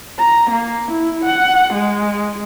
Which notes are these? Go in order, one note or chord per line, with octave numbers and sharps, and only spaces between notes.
A#5
A#3
E4
F#5
G#3